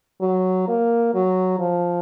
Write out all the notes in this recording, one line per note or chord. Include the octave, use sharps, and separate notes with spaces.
F#3
A#3
F#3
F3